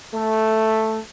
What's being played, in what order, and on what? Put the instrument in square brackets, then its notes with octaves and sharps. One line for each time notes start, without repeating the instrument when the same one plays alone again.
[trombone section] A3